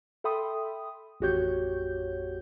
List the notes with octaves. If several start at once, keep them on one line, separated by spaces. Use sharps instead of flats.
A4 E5 G5 B5 C6 D#6
A1 F2 F#4 G4 C#5 G6